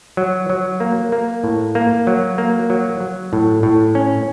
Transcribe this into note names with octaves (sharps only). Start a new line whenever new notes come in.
F#3
F#3
A#3
A#3
A2
A#3
F#3
A#3
F#3
F#3
A2
A2
C#4